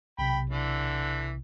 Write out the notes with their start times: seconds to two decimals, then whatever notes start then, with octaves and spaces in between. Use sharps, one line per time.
0.19 B1 C3 G5 B5
0.50 D3 E3